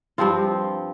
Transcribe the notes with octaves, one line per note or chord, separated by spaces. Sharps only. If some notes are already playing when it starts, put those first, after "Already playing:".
G2 F3 C4 F4